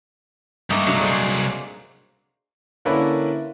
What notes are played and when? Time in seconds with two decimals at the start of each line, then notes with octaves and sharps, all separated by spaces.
0.70 G2 A3 A#3 D#4
0.87 C2 G2 F#3 F#4
1.00 G#4 C5 D5
2.85 D3 A#3 C#4 D4 E4 B4